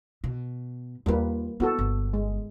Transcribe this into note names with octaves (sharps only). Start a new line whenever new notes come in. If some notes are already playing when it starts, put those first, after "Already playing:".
B2
D#2 G3 A#3 F4 B4
B3 E4 F#4 A4
G1
G#3